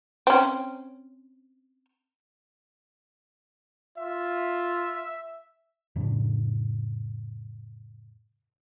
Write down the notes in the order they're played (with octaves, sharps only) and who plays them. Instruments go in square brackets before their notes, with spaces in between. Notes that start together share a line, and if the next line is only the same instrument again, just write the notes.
[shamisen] C4 C#4
[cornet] F4 [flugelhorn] E5
[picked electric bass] F2 A2 C#3 D4